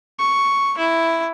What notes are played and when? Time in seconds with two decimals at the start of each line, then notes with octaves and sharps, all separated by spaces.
0.19 C#6
0.78 E4